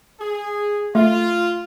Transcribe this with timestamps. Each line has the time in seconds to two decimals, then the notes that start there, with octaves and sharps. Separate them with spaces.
0.20 G#4
0.95 A3 F4